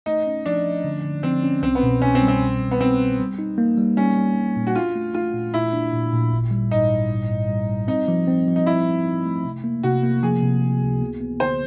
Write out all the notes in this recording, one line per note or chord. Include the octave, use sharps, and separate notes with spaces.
A3 D#4
C#4
F3 D4
F3
D3
D3
F3 C4
C#4
C2 C4
B3
B2
C2 C#4
C4
G3
C4
C2
C2
B3
C2 C4
G3
G3
D#4
A#3
G3
G3 C#4
G3
G3
A#2
F#4
D4 F4
A3
A3 F4
A#2
A#2 E4
D4
A#2
A#2
G#1
G3
G#2 D#4
G#2
G#2
G#2
G3
G3
C4 D#4
F3
C4
F3
D#4
F3 E4
D#4
D#4
A3
C3
A#3
C3 F#4
A#3
F3 G#4
C3
A#3
C#2
B3
B3
D3 C5